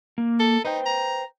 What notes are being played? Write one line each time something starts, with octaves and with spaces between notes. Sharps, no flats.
A#3
A4
D#4 B4 C5 G5
A#5